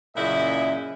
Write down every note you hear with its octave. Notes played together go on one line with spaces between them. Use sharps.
F#2 A#2 C#3 E4 D#5 E5